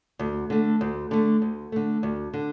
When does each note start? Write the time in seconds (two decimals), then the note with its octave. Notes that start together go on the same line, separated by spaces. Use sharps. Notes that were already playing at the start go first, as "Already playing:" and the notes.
0.19 D2
0.50 D3 A3
0.81 D2
1.11 D3 A3
1.42 D2
1.72 D3 A3
2.03 D2
2.34 D3